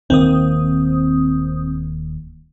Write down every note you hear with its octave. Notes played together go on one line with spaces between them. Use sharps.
D#1 D#3 A#3 C4 D#6